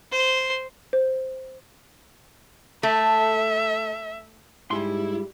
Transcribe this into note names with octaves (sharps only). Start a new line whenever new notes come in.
C5
C5
A3 E5
G#2 G3 E4 G4 G#4 C6